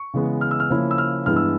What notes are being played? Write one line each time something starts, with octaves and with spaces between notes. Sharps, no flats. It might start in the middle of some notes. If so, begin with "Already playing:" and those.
Already playing: C#6
C#3 E3 G#3 B3
F6
E6
F6
C#3 F3 A#3 C#4 E4
E6
F6
G2 E3 G#3 B3 E4 F6
E6